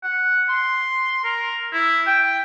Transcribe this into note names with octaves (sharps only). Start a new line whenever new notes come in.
F#5
C6
A#4
E4
G5